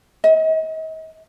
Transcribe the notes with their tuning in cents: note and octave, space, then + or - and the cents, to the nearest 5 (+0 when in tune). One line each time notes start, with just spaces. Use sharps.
D#5 +40